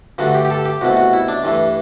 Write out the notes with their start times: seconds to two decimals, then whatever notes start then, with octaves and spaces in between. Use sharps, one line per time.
0.18 G2 D3 A3 F#4
0.35 G4
0.45 G4
0.50 A4
0.66 G4
0.81 C2 B2 A3 F#4
0.97 F#4
1.13 E4
1.28 D4
1.44 G2 E3 A3